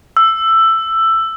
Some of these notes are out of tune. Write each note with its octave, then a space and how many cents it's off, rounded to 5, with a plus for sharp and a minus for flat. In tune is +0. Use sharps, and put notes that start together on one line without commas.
E6 +10